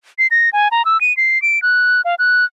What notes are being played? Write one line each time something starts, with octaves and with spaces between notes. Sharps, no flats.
C7
A#6
G#5
A#5
E6
D#7
C7
D7
F#6
F5
F#6